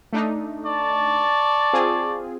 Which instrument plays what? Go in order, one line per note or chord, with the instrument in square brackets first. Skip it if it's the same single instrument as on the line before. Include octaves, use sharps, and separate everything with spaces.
[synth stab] A3 D4 D#4
[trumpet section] D5 A5 C#6
[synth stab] C4 F4 G#4